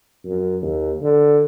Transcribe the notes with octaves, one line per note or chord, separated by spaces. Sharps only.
F#2
D#2
D3